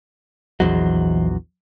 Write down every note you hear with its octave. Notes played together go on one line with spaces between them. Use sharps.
A#1 E2 E3 F#3 C5 D#5